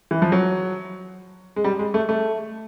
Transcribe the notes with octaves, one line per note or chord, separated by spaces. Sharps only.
E3
F3
F#3
G#3
G3
G#3
A3
A3